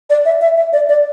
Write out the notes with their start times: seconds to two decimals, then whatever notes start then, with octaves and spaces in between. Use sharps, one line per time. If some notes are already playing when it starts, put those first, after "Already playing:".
0.10 D5
0.25 E5
0.41 E5
0.57 E5
0.73 D5
0.89 D5